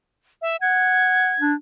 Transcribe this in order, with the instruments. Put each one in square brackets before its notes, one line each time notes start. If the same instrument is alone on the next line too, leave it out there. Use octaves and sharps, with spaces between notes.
[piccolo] E5
[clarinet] F#5 [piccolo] G#6
[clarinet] D4